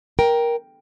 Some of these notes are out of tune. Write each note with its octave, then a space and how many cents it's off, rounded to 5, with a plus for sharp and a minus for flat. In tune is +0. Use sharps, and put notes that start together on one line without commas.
A#4 +15 G5 +0